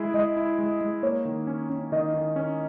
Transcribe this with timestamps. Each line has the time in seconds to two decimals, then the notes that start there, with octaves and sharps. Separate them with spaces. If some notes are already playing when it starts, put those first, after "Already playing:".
Already playing: G#3 E4 G#4
0.14 G#3 D#5
0.37 E4
0.59 G#3
0.81 G#3
1.03 A#3 C#5
1.25 D#3
1.47 C#4
1.70 C#4
1.92 D#3 D#5
2.14 D#3
2.36 C#4